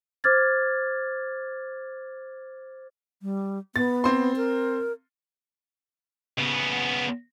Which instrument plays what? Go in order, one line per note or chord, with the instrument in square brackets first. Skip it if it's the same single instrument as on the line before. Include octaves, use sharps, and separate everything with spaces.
[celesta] C5 D6 F6 G#6 A6
[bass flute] G3
[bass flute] B3 [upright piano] A6
[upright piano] C4 C6
[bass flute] A#4
[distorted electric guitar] C#3 B3